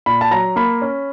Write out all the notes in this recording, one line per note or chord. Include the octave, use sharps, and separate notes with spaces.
A#2 B5
A5
F#3 A#5
A#3 B5
C#4